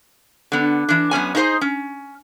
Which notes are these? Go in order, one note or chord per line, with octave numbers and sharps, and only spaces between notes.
D3 B3
E3 D4
F#2 B3 C#4 G#5
D#4 E4 G#4 B4 C5 D#5
C#4